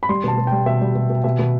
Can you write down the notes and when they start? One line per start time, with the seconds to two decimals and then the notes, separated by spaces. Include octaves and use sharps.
0.03 B5
0.09 G3 C6
0.24 B2 A5
0.38 B2
0.47 G3 G5
0.66 B2 E5
0.81 G3
0.95 B2
1.10 B2
1.24 B2 E5
1.39 B2